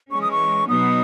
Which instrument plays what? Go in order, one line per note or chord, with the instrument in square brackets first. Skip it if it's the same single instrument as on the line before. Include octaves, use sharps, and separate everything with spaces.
[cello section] E3 G#3 C#4 [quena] C#6
[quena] D#6
C#6
[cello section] B2 F#3 B3 D#4 F#4 [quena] D#6